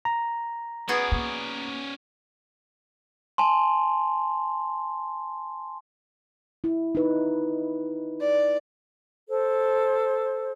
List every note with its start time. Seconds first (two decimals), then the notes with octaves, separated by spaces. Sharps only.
0.05 A#5
0.89 B3 C#4 F#4 G#4 D5
1.12 A#3
3.38 G#5 A5 C6
6.64 E4
6.95 D#4 B4
8.21 D5
9.28 A4 C5